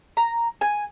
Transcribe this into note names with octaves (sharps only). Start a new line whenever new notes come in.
A#5
G#5